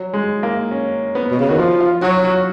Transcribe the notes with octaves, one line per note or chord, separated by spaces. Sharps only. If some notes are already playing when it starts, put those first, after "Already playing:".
Already playing: F#3
G#3
A#3
C#4
B3
B2
C#3
D#3 F#4
F3 F4
F4
F#3 F#4
F#4